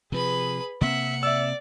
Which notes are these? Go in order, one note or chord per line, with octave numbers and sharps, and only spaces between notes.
C3 F3 G#4 B4 B5
C3 A#3 C4 E5 F#5
D5 E5 E6